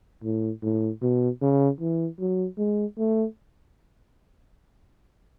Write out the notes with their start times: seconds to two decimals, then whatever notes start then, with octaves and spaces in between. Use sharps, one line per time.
0.24 A2
0.63 A2
1.02 B2
1.42 C#3
1.80 E3
2.20 F#3
2.58 G#3
2.98 A3